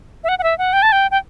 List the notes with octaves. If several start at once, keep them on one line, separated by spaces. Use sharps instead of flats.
E5
F#5
F#5
E5
F#5
G5
A5
G5
G5